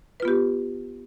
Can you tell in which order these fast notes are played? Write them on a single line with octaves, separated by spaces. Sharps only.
B4 F4 B3 G4